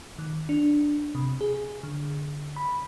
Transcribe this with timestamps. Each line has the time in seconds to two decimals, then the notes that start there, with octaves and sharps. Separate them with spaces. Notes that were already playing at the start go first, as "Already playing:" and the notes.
0.18 D#3
0.49 D4
1.15 C3
1.41 G#4
1.83 D3
2.56 B5